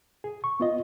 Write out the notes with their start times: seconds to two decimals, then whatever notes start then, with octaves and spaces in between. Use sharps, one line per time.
0.24 G#4
0.44 C#6
0.60 B3 F4 D#5